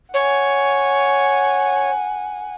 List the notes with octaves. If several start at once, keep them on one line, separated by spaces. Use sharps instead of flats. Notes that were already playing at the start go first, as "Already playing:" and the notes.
C#5 F#5 G#5